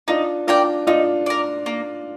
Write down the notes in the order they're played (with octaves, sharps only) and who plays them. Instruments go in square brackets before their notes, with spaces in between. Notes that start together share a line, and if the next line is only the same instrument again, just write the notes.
[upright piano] D4 F4 [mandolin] D#4
[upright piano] D4 F4 [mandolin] A#4 D5 G5
[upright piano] D4 F4 [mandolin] D#4
[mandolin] A#4 D5
A#3